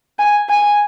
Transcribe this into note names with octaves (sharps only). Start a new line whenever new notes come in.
G#5
G#5